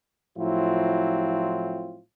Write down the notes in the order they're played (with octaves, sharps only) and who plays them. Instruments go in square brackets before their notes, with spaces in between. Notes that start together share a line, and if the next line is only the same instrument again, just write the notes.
[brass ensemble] A2 F3 F#3 C4 E4 F4